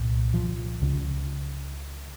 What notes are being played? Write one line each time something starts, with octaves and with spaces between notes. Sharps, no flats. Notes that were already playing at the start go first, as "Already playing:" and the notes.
Already playing: C2 A#2
F3
C#2 C#3